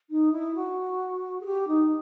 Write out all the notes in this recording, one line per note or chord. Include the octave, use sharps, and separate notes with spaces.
D#4
E4
F#4
G#4
G4
D#4